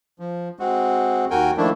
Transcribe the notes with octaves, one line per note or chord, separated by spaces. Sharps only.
F3
G#3 C4 F#4
D#2 F#4 A#4 G5 G#5
D#3 F3 A3 A#3 D4 E4